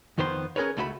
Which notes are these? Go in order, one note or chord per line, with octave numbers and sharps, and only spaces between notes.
F2 D#3 B3 C5 B5 C6
C#4 G#4 A#4 B4 C#5
C#2 A3 E4 F#4 E5 B5